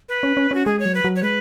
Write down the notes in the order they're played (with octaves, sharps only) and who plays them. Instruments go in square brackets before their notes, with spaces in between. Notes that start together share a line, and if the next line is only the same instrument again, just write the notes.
[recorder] B4
[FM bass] C#4
C#4
[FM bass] C#4 [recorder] F#4
[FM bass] G#3 [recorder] G#4
[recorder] C#5
[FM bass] F#3
[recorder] B4
[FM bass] F#3
[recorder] C#5
[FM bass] G#3 [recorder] B4